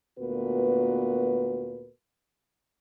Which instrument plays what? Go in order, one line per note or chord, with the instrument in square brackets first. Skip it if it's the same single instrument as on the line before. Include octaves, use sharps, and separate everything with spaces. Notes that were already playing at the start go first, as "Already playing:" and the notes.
[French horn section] D2 A#2 B3 F#4 A#4 B4